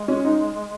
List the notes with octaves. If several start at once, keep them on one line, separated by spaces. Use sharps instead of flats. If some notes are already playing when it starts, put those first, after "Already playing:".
Already playing: G#3
C#4
D#4